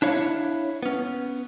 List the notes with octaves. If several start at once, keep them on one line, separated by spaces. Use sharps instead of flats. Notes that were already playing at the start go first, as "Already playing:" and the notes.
D4 E4 C#5 F5
B3 C#4